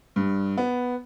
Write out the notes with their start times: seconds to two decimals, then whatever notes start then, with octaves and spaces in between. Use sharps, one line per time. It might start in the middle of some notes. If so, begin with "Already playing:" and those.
0.16 G2
0.57 B3